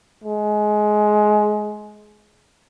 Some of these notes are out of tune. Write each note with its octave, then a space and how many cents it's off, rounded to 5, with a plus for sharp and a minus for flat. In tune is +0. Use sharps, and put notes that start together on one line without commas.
G#3 +20